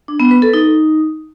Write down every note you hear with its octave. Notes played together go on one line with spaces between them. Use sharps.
D4
B3
B4
A4
D#4